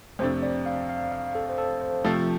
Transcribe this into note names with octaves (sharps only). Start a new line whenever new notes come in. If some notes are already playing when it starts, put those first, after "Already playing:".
F2 C3 A3 D4 C5
D5
F5
F5
F5
A4
C5
A4
C5
C3 F3 A3 A4